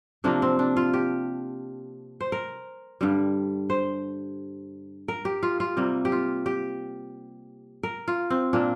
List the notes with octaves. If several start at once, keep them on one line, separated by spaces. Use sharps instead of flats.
C3 F3 A#3 D4
C4
D4
F4
G4
C5
A#4
G2 D3 G3
C5
A#4
G4
F4
F4
C3 G3 A#3
G4
F4
G4
A#4
F4
C4
A#2 A#3 D4